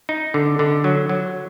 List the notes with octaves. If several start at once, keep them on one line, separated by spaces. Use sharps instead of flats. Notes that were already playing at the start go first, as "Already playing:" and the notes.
D#4
D3
D3
F#3
F#3